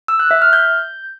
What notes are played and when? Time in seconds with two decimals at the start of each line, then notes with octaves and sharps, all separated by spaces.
0.08 E6
0.20 F#6
0.31 E5
0.42 F6
0.53 G6